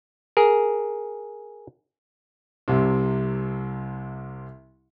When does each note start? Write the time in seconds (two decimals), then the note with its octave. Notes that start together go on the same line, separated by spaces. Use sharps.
0.37 G#4 A#4
2.68 C2 C3